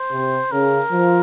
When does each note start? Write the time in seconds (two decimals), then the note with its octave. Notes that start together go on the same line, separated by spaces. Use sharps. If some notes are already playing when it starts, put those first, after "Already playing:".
Already playing: C5
0.12 C3
0.52 C#3 A#4
0.92 F3